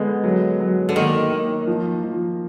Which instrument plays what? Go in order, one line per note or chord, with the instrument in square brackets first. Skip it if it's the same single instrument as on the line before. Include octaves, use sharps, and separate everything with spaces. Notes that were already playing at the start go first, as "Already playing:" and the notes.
Already playing: [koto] D3 [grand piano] G#3 B3
[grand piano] F#3
F#3
[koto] D3
[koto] D#3 [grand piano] A#3
[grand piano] A#3
F3
F3